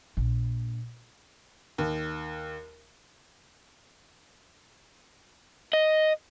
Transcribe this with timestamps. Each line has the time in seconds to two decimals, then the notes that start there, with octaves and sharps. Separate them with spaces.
0.17 A#1
1.78 D#2
5.73 D#5